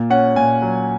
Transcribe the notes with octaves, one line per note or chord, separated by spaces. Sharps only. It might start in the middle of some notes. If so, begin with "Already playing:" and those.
Already playing: A#2
C#4 F#5
A#2 G#5
F#3